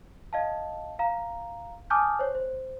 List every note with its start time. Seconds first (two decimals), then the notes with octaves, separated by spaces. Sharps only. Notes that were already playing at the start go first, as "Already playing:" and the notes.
0.33 D#5 F5 A5
0.99 F5 A#5
1.90 G#5 A5 D6 D#6 F6 G6
2.19 C5 C#5
2.35 C5